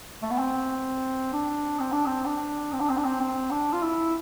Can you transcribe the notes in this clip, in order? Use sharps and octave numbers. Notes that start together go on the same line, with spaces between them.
A3
B3
C4
D4
C4
D4
C4
D4
C4
D4
C4
D4
C4
C4
D4
F4
E4